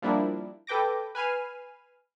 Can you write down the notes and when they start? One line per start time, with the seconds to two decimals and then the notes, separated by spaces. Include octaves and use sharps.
0.02 F3 G3 A#3 D4 E4
0.67 A4 B4 G5 D6 A#6
1.15 B4 G#5 F6 C7 D#7